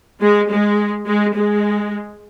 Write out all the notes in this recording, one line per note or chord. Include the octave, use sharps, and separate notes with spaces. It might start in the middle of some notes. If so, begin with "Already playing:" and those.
G#3
G#3
G#3
G#3